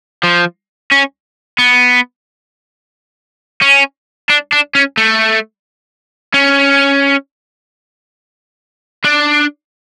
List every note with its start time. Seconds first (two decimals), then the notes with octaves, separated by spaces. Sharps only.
0.23 F3
0.91 C#4
1.59 B3
3.62 C#4
4.30 D4
4.53 D4
4.75 C#4
4.97 A3
6.34 C#4
9.04 D4